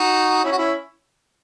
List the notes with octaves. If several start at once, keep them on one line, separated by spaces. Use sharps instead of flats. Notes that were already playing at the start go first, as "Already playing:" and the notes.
Already playing: D#4 F#4
C#4 E4
F#4
C#4 E4